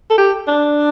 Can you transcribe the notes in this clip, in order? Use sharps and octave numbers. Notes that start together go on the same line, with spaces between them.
A4
G4
D4